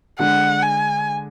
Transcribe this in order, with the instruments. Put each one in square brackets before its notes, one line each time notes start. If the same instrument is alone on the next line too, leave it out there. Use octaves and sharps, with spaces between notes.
[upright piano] D3 G#3 D4 [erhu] F#5
[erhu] G#5